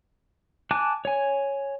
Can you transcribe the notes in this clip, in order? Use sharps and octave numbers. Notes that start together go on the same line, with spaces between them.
G#5 A5 D6 F#6
C#5 G#5